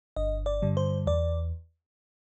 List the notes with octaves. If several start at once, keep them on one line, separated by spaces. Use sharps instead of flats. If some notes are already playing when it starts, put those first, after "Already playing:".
G1 D#5
D5
G2 D3 G3
C5
E2 D5